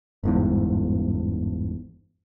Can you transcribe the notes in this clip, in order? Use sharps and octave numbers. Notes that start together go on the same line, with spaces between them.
G1 E2 G#2